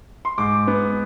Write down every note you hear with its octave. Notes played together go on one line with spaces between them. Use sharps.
C6
G#2 D6
B3